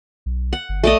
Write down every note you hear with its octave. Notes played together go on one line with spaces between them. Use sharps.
B1
F#5
G1
A#1 A3 D5 D#5